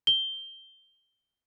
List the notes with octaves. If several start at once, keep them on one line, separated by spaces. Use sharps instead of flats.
G7